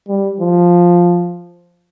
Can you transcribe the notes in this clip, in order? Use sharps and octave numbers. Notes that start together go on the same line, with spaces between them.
G3
F3